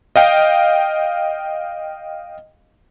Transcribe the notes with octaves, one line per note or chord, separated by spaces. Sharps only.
D#5 F5 G5